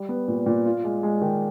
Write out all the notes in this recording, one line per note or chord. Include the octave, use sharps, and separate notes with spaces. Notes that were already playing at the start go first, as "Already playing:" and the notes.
Already playing: G3
B3
A#2
A#2
F4
G#3
G#3
D#3